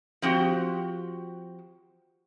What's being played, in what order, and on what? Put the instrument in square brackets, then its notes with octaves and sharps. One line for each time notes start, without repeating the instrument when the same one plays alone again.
[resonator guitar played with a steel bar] F3 C4 F#4 G4